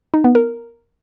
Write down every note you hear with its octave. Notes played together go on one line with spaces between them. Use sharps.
D#4
B3
A#4